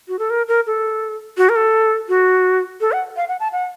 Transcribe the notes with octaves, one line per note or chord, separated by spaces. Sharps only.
F#4
A4
A#4
A#4
A4
F#4
A#4
A4
F#4
A4
F#5
F5
F#5
A5
F#5